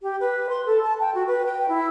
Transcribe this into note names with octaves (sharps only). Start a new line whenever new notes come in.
G4
B4
C6
A4
A5
G5
F#4
B4
G5
E4